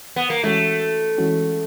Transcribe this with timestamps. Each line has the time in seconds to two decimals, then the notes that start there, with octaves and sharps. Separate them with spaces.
0.16 B3
0.30 A#3
0.43 E3 G#3 A3 C#4 F#4
1.18 E3 G#3 C#4 F#4